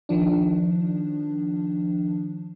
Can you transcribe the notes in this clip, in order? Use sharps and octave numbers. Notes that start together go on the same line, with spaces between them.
D#3 F3 D4